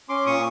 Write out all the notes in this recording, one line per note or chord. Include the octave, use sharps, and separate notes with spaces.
C#4 C6 D6
A#2 C#6 D#6